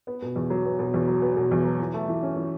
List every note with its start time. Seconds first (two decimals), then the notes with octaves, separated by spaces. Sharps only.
0.07 B3
0.22 B2
0.36 E2
0.50 F#3
0.65 B3
0.79 B2
0.94 E2
1.07 F#3
1.22 B3
1.37 B2
1.51 E2
1.65 F#3
1.80 E3
1.94 A3
2.08 E3
2.22 C#4
2.36 E3